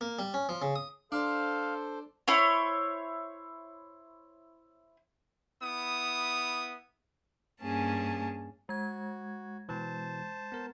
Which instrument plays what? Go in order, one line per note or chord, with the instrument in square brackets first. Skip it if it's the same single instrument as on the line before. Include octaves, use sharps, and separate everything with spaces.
[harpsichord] A#3
G3
C#4
F3
C#3
D#6
[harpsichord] D4 [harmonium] A4 C5 [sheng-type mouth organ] F5
[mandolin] E4 C5 C#5
[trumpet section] B3 E4 D#6
[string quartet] G2 A#3 C#4 G#4 A5
[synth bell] G#3 G#6 [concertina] F#4
[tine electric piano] B2 E3 [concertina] C5 A5
[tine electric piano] B3 A#4